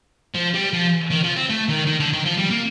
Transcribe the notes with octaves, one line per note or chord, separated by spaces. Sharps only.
F3
G3
F3
D#3
F3
C4
A3
D#3
D#3
D3
D#3
F3
G3
A#3